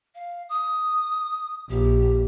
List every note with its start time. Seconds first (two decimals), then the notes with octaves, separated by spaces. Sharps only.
0.15 F5
0.49 D#6
1.70 A#1 G4